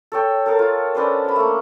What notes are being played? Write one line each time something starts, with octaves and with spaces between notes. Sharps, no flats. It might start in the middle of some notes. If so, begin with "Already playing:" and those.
A4 C#5 G5
A4 A#4 F5
F4
C#4 D4 B4 C5
A#4 B5
A3 A#3